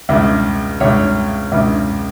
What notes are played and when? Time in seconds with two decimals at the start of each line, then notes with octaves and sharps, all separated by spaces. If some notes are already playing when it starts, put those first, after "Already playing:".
0.09 C#2 C#3
0.80 C#2 C#3 C#5
1.52 C#2 C#3